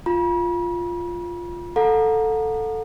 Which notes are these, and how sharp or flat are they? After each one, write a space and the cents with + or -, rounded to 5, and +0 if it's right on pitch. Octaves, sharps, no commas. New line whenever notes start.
F4 +0 B5 -45
A4 +5 F#5 -35 A#5 +10